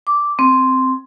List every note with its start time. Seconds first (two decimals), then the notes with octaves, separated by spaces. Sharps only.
0.07 D6
0.39 C4